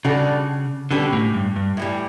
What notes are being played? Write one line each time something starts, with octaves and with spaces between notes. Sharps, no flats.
C#3 G3 D4 F#4 A4
B2 D3 G3 C#4 G4 B4
A2
G2
G2
A2 E3 G3